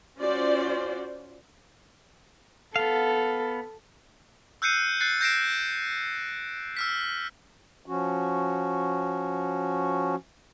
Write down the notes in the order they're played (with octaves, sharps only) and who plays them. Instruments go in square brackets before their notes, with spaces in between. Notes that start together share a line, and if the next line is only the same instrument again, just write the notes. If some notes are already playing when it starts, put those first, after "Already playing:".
[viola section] C#4 F4 F#4 C5 D5
[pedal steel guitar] B3 F5 [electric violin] A4
[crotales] E6 F#6 G6 C7 C#7 D#7
F#6 A6 C7 C#7
G6 A#6 C7 D7 E7
E6 F6 B6
[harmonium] F3 C#4 F#4